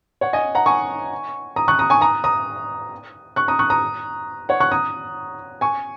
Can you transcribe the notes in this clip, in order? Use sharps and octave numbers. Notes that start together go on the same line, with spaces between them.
C#5 F#5
D#5 G#5
F#5 A#5
G#5 C#6
A#5 D#6
C#6 F#6
A#5 D#6
G#5 C#6
A#5 D#6
A#5 D#6
C#6 F#6
A#5 D#6
C#6 F#6
A#5 D#6
C#5 F#5
C#6 F#6
A#5 D#6
G#5 C#6